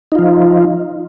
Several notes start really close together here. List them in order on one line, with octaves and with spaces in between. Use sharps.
D#4 F4 F3